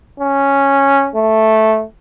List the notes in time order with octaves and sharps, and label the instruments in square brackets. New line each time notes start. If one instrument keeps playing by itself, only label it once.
[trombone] C#4
A3